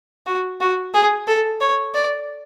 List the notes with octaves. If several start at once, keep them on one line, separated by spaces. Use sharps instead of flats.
F#4
F#4
G#4
A4
C#5
D5